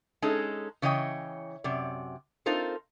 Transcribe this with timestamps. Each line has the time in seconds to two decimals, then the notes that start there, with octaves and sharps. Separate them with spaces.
0.22 G#3 C#4 D#4 A4
0.82 C#3 E3 C#5 D#5 G5
1.64 F#2 C3 D5
2.46 C4 D#4 F4 A4 A#4 C5